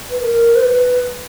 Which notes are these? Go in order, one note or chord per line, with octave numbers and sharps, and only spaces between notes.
B4
A#4
C5
B4